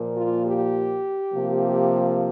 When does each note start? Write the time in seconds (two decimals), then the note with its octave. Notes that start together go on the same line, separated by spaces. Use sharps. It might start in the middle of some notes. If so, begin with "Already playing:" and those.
Already playing: A#2 F3 A#3
0.17 F4
0.46 G4
1.32 C3 F3 A#3